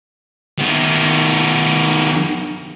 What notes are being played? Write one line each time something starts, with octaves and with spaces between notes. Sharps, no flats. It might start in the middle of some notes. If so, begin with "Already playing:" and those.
D#3 B3